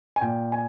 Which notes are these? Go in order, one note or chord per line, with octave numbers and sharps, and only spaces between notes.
G#5
A#2 G5
G#5